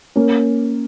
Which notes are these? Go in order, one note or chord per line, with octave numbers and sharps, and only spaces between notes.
A#3 C#4